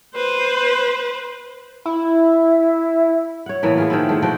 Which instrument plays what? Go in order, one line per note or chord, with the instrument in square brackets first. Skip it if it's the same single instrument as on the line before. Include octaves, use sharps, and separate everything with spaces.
[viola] B4 C5
[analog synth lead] E4
[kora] C#5 F#5
A2 E3 A#3 B3
F4 G#4
D#3 F3 E4
G#3 A3
B2 F3 F#4 G5